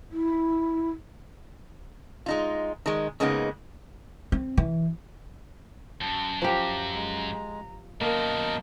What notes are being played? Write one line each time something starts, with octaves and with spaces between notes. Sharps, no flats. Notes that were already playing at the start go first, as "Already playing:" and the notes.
E4
G#3 D#4 F4
D#3 G#3
C#3 G#3 A#3 B3 D#4
C4
E3
F#2 A5
F3 G4 A#5
G#3
F#2 B2 A#3 A#4 D#5 A5